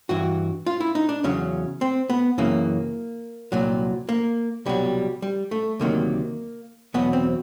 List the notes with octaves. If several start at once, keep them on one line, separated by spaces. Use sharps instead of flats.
G2 E3 F#4
F4
E4
D#4
D4
E2 C#3 F#3 C#4
C4
B3
F#2 C#3 E3 A#3
C2 A#2 F#3
A#3
C2 B2 F#3 G3
G3
A3
D2 C3 D#3 F#3 A#3
E2 B2 F#3 B3
C4